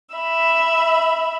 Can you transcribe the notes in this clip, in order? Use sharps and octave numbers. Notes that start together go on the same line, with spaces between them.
E5 B5